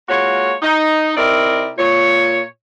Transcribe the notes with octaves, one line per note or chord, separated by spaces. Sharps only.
G#3 A#3 F4 F#4 C#5
D#4
C3 C4 D#4 E4 A#4 D5
A#2 C#5